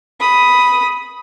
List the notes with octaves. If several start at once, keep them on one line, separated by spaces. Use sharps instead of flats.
B5 D#6